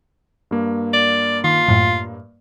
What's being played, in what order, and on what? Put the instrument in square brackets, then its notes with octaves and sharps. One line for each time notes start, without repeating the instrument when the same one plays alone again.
[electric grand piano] G2 A#3
[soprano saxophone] D5
[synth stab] D#3 [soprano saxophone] F4
[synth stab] F#2 A2